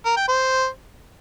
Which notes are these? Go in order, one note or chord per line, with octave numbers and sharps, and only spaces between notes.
A#4
G5
C5